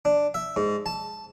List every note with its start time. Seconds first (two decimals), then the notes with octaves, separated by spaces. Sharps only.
0.05 D4
0.34 E5
0.56 G#2
0.86 A5